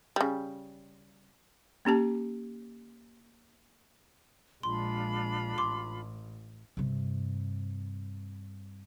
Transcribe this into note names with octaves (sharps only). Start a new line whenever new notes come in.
C#3 G3
A#3 C#4 G4 A5
A#1 G#3 D4 F4 B5 C6
A1 C6 D6
G2 C3